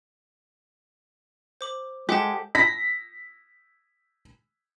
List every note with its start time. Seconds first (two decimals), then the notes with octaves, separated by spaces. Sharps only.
1.61 C5 D6 F#7
2.09 G#3 G4 A4 F#5 A5
2.55 A#6 B6